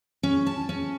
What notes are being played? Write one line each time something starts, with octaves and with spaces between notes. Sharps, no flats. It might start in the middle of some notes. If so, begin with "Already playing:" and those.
C#4
A5
C#4